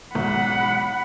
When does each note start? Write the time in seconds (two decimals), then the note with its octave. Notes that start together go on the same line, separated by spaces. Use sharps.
0.15 B1 G#2 F#5 B5